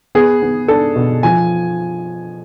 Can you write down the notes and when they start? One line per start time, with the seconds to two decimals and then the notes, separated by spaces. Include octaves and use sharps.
0.15 B3 G#4
0.42 B3
0.68 D4 A4
0.96 B2
1.23 F3 G#5